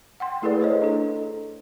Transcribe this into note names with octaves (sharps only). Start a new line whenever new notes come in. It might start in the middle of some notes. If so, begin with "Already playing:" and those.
F#5 G5 C6
A3 E4 G#4 A4 B4 D5
G#4 C5 C#5 D#5
D4 A4